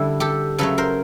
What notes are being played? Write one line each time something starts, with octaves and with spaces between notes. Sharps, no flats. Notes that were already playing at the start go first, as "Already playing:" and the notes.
Already playing: D3 G3 D4 E4
G4 A4
C#3 F#3 A3 A4 B4
A#4 C5